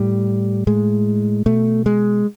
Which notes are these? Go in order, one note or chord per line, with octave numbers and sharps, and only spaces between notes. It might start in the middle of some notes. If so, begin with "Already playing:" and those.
Already playing: A2 G3
A2 G#3
B2 A3
G#3